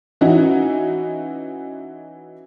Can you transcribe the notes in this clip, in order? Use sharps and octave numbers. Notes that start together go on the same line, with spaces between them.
E3 C#4 D#4 E4 F#4